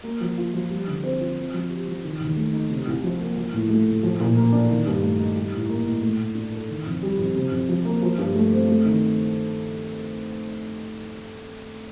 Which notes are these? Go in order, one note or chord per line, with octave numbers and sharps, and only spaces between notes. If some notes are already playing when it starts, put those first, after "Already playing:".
A#3
F3
F4
F3
G3
D3
C4
F4
C4
F3
G4
F3
D#3
D#2
A3
D#4
C3
C2
F3
A#3
F3
A2
A3
A2
F3
A#2
A#3
D4
D#3
G2
A3
D#4
G3
A2
A#3
A2
A3
A2
D4
A4
D#3
F2
G3
F2
C3
F2
F3
A#3
F3
G2
A3
C4
A3
D#3